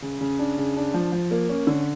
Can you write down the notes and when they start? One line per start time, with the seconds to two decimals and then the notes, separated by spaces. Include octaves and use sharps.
0.02 C#3
0.21 C#3
0.39 D4
0.57 C#3
0.76 D4
0.94 F3
1.12 F3
1.31 A#3
1.49 C#4
1.67 D3